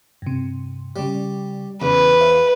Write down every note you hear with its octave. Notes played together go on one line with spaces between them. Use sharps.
G2 C3
C#3 G3 D5
E2 C#3 B4
C5 E5 F5